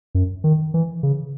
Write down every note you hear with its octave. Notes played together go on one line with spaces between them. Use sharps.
F#2
D#3
E3
C#3